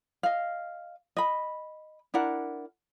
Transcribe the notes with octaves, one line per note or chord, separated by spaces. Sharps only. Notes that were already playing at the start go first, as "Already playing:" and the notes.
D#5 F5
D#5 B5
D4 E4 A#4 F#5